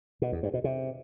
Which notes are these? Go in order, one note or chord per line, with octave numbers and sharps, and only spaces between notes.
B2
E2
G2
B2
C3